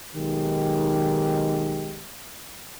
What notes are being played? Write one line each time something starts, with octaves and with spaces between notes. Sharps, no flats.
B1 D#3 G#3 G4